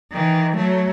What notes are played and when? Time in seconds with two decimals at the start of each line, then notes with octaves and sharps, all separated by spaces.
0.12 D#3 E3
0.56 F#3 A3